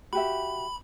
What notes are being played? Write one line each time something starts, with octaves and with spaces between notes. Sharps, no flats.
F#4 G4 E5 B5